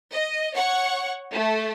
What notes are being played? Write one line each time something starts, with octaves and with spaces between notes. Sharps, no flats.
D#5
C#5 F#5 C#6
A3